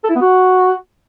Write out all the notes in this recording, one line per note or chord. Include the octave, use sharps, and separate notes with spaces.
A4
E4
B3
F#4